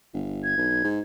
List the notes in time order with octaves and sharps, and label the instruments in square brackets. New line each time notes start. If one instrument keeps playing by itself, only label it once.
[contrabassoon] G1
[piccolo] G#6
[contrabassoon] B1
G#2